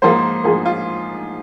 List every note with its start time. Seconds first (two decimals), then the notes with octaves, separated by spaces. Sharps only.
0.02 G#2 F3 A#3 C5
0.44 G#2 F3 A#3 G#4
0.65 F4